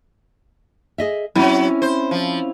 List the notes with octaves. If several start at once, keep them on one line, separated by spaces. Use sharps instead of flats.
G#4 D#5 E5
F#3 C4 C#4 E4
C5
F3